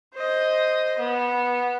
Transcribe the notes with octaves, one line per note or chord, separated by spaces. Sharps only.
C5 D#5
B3